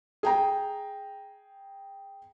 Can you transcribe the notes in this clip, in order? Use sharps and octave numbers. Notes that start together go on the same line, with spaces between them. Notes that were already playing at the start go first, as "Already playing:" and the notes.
G#4 G5 A#5